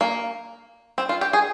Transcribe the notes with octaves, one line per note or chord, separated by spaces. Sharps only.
A#3
C4
F4
G4
G#4